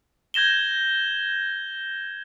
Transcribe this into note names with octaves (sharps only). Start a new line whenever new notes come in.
G6 G#6 A#6 E7 G7